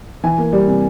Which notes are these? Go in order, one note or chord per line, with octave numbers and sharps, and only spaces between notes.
E3 G#5
A#3
G3
C3